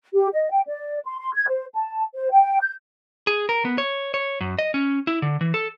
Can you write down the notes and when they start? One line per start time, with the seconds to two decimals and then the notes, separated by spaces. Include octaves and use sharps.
0.15 G4
0.33 D#5
0.51 G5
0.68 D5
1.05 C6
1.19 C6
1.34 G#6
1.48 C5
1.74 A5
2.14 C5
2.31 G5
2.61 G6
3.27 G#4
3.49 A#4
3.65 B3
3.78 C#5
4.14 C#5
4.41 F#2
4.59 D#5
4.74 C#4
5.07 E4
5.22 D3
5.41 E3
5.54 A4